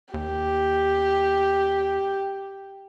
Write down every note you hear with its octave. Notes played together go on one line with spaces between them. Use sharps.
D#2 G4